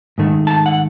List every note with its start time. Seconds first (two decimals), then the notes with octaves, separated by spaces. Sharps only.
0.18 G#2 D#3 A3
0.47 A5
0.66 F#5